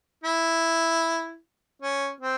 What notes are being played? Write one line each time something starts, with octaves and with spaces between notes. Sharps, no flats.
E4
C#4
C4